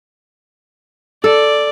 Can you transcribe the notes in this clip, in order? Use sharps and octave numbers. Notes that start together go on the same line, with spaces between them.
A4 D5